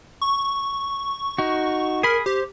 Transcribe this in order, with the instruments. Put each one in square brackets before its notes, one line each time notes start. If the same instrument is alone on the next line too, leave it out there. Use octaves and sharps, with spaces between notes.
[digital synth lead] C#6
[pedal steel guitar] D#4 F#4
[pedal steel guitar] G#4 B5 [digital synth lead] A#4
[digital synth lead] G4 [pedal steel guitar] C5